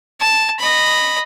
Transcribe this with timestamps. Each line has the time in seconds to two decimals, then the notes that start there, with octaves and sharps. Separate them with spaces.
0.20 A5
0.60 D#5 B5